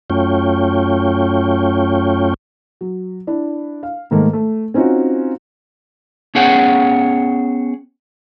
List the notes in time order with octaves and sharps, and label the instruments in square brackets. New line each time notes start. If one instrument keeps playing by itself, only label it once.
[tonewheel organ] F#2 A3 C#4 F4 C#5 G5
[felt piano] F#3
D4 E4
F5
G#2 D#3 A3 A#3
A3
C4 C#4 D#4 F4 F#4
[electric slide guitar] B3 C#4 G#4 C#5 F#5 G5